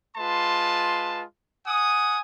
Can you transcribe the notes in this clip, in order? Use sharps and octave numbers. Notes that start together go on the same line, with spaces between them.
G#3 F4 B4 A5 C6
F#5 G#5 D#6